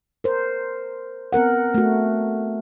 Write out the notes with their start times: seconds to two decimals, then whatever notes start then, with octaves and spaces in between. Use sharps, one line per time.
0.24 A#4 C5
1.33 B3 C4 A#4 F#5
1.74 A3 F#4